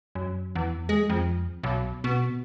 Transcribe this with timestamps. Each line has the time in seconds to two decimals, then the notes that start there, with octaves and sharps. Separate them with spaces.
0.15 F#2
0.55 E2
0.89 G#3
1.10 F2
1.63 B1
2.04 B2